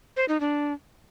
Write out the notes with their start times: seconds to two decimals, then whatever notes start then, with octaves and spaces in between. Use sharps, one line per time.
0.16 C5
0.28 D#4
0.40 D4